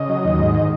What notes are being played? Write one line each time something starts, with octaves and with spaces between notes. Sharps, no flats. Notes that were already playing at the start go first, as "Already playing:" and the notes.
Already playing: C#3 D#5
F#3
D#2
G#2
D#3